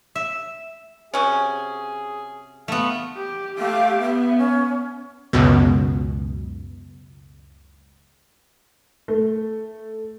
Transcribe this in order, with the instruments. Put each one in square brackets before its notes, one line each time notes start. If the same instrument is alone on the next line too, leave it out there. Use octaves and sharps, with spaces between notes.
[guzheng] E5
[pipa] C3 F#3 C#4 [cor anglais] G#4
[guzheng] A3 B3 [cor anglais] F5
[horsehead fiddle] G4
[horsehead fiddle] A3 G4 [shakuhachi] F5
[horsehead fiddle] B3 [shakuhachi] E5
[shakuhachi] C#4
[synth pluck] C#2 F#2 B2
[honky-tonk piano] A3